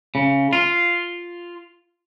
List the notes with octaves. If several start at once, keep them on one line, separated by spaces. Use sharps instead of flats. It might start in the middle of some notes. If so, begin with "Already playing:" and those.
C#3
F4